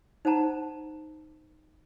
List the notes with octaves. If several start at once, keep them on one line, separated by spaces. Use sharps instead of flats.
D#4 C5 F#5 A5 A#5